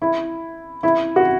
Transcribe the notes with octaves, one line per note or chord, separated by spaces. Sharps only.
E4
E4
F#4